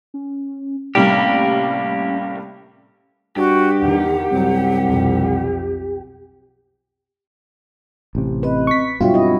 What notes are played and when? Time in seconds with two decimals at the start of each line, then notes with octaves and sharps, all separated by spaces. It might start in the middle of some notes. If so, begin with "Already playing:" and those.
0.14 C#4
0.95 A2 C3 G3 A#3 C#4 G4
3.37 G2 F#4 G4
3.80 E2 D#3 F#5
4.31 C2 F#2 F#3
4.86 B1 F2
8.15 A1 C3
8.43 C4 B4 D#5
8.67 C#6 B6
9.01 G2 B2 F#3 B3 F4 F#4 E5 G5
9.14 C4 E4 D#5